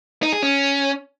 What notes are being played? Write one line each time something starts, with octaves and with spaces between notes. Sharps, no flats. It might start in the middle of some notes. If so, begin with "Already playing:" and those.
D#4
G#4
C#4